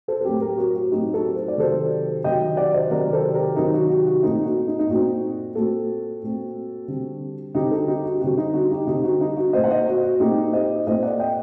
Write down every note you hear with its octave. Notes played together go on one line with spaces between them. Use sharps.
A4 C5
A4
A2 F#3 C4 G4 A#4
G4 A#4
F#4
F#4
A2 F#3 C4 D#4 G4
F#4 A4
C5
D5
C3 D#3 F#3 A4 C5
C3 D#3 F#3 D#5 G5
D5 F#5
C5 D#5
C3 D#3 F#3 A#4 D5
A4 C5
G4 A#4
C3 D#3 F#3 D#4
F#4
F#4
F#4
A#2 A3 C4 D#4
F#4
D#4
D#4
A#2 A3 C4 F#4
A#2 A3 C4 F#4 A4
A#2 A3 C4
D3 G3 C4
D3 G3 C4 D#4 G4
F#4 A4
D#4 G4
F#4
D3 G3 C4 F#4
D#4
F#4
D#4 G4
D3 G3 C4 D#4 G4
F#4
D#4
F#4
A#2 A3 C4 C5 D#5
F#5
C5 D#5
F#4
F#4
A#2 A3 C4 D#4 G4
C5 D#5
A#2 A3 C4 C5 D#5
D5 F#5
D#5 G5